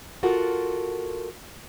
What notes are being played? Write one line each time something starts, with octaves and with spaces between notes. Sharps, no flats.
F4 F#4 A4 A#4 F#5